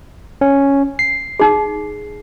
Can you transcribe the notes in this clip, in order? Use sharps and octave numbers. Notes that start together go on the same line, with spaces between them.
C#4
C7
D#4 G#4